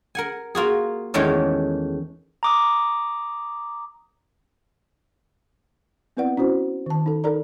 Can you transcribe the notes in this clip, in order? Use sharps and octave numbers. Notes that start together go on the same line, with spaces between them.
A#4 F#5 G#5
A#3 F4 F#4 G#4
E2 D#3 E3 G#3 A3 C#4
A#5 D6 D#6
B3 C4 E4 B4 D5 F#5
C#4 E4 F#4 C5
D#3 A5
D#4 A4
D#4 A4 A#4 D5 A#5